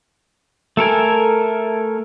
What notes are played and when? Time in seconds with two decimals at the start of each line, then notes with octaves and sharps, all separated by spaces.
0.77 A3 A4 A#4 G#5